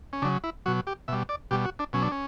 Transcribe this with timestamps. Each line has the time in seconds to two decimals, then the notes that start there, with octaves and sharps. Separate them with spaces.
0.13 C#4
0.22 C#3 F#3 D4
0.44 E4
0.66 B2 F#3 F#4
0.87 G4
1.08 B2 G3 E5
1.29 D5
1.51 B2 G3 G4
1.65 F#4
1.79 D4
1.93 B2 F#3 C#4
2.02 D4
2.12 C#4